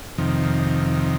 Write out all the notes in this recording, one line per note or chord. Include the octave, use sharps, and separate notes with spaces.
F2 C3 D#3